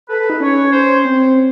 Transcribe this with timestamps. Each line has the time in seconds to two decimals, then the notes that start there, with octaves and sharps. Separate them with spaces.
0.09 A4 B4
0.20 A4
0.30 D#4
0.40 C#4 C#5
0.72 C5
1.05 C4